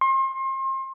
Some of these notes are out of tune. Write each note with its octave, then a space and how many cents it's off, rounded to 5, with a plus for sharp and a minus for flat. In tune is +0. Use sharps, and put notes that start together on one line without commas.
C6 +35